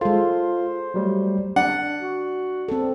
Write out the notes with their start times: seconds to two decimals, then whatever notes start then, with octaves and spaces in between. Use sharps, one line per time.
0.01 G#3 F4 A4 C5
0.94 F#3 G3 A3
1.56 D4 D5 F#5
2.00 F#4
2.68 C4 A4